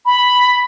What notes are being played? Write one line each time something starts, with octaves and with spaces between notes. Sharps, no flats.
B5